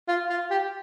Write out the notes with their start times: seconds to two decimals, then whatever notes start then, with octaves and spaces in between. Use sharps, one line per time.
0.08 F4
0.30 F4
0.50 G4